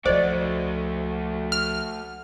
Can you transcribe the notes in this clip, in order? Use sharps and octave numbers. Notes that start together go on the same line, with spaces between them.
C#2 F3 A3 F#4 C5 D5 D#5
F6